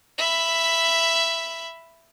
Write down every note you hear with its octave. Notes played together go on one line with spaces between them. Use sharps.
E5 B5